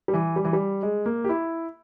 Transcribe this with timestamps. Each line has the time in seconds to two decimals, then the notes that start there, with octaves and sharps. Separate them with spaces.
0.08 G3
0.14 E3
0.36 G3
0.45 E3
0.53 G3
0.83 G#3
1.06 A#3
1.24 G4
1.29 E4